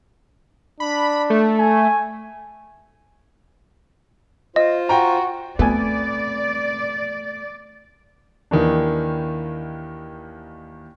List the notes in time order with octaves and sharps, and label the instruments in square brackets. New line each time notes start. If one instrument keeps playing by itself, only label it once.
[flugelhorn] D4 [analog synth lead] B5
[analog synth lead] A3
[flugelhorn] G#5
[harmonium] F4 C5 [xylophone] D#5
[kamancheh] F#4 [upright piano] G5 A#5
[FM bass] A3 [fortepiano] B3 G#5 [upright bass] C4 [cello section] D5
[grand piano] D#2 D#3 E3 D4